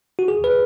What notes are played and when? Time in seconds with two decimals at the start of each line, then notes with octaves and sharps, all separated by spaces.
0.19 F#4
0.28 G#4
0.44 B4